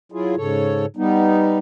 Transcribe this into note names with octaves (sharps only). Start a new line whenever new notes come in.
F#3 E4 F4 G#4
G#2 C#3 A4 C#5
G3 B3 D#4